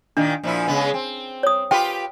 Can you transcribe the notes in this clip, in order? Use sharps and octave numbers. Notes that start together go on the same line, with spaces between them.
A#2 D#3 A#3 D4
A#2 F3 E4
C#3 G#3 B3
C4
C#5 D#6
F4 G4 B4 G5